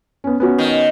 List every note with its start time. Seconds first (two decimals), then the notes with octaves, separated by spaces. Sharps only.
0.24 B3 C#4
0.40 B3 C#4 F#4
0.58 D#3